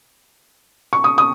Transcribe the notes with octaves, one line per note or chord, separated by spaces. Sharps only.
C#6
D#6
D#6